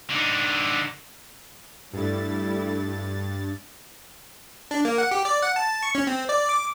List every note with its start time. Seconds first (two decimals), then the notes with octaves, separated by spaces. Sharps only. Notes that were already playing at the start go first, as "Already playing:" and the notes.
0.11 D3 D#4
1.93 G2 G3 A3 E4 A6
4.71 D4
4.85 A#3
4.98 F#5
5.11 G4
5.25 D5
5.42 F#5
5.56 A5
5.83 C#6
5.95 C#4
6.07 C4
6.29 D5
6.49 D6